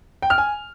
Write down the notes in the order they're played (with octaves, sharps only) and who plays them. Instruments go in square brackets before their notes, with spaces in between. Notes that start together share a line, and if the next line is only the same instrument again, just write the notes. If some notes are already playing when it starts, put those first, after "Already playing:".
[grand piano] G5
F6
G#5